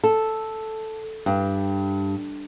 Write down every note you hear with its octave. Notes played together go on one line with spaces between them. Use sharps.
A4
G2